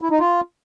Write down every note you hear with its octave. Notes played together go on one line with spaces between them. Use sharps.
E4
D#4
F4